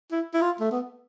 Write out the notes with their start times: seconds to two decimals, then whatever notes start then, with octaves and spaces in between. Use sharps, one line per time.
0.11 E4
0.34 E4
0.41 F4
0.60 A3
0.72 B3